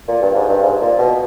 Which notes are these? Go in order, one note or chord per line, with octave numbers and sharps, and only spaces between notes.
A#2
G2
G#2
G2
G#2
A#2
B2